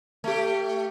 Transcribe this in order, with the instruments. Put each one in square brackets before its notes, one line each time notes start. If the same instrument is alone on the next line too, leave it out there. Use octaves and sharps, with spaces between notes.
[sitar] A3 G4